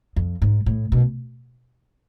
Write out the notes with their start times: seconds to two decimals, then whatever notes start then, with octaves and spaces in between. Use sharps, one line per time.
0.16 F2
0.42 G#2
0.66 A2
0.92 B2